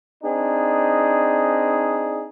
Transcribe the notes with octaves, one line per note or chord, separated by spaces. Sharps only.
C4 D4 D#4 G#4